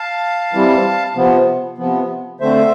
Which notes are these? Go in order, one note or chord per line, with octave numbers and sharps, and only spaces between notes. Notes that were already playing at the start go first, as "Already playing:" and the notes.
Already playing: F5 A5
E3 G3 C4
C3 F3 B3
C3 F3 B3
D3 A3 C4 C5 E5